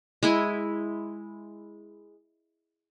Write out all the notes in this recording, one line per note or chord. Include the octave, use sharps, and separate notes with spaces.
G#3 E4 G#5